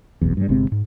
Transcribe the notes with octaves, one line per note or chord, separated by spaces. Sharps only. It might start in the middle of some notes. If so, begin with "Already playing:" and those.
F1 B1 E2
G2 G3
G1 C3 G#3 C4
G#2